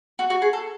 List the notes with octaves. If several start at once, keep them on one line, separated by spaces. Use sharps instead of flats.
F#4
F#4
G#4
A4